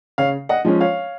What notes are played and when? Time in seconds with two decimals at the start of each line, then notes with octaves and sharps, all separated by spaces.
0.18 C#3 C#5 F5
0.49 D#5 F#5
0.65 F3 G#3 C#4
0.81 C#5 F5